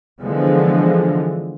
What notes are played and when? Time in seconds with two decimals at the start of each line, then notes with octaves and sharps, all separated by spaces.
0.21 D3 E3 F3 G#3 B3